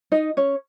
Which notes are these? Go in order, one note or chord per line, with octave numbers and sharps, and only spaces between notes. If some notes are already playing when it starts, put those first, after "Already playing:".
D#4 D#5
C#4 C#5